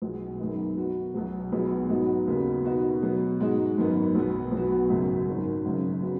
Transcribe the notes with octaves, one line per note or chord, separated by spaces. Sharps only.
B1 B2 G#3
F#2 D#3 G#3 B3 D#4
B2 B3 F#4
B1 B2 F#3
B1 B2 G#3 B3 F#4
G#2 F#3 B3 D#4 F#4
D#2 C#3 B3 F#4
B2 B3 D#4 F#4
B2 F#3 B3
G#2 G#3 D#4 F#4
G#1 F#2 D#3 B3
B1 B2 B3
B1 B2 B3 F#4
G#1 F#2 C#3 F#3
G#1 F#2 D#3 F#3
G#1 F#2 C#3
C#3 B3 F#4